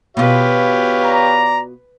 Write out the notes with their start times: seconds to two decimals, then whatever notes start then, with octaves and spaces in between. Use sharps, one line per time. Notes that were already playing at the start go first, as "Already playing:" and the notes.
0.17 B2 F4 G4 B4 C#5 F5
1.05 D5 A#5